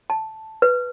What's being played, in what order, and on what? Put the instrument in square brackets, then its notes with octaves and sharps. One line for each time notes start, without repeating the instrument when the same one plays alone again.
[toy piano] A5
B4